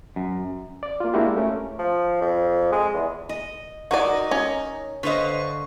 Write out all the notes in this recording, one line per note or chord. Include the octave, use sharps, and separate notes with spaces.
F#2
D5
A#3 F4
G#3 A#3 D4 E4 F#4 G4
A3 C#4 A#4
F3
F2
G#3
E2
D#5
D#4 F#4 A#4 D5 D#5
C#4
D3 B4 C5 D#5 F5 C#6